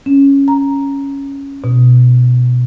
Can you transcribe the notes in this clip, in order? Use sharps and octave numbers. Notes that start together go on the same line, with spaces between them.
C#4
A#5
B2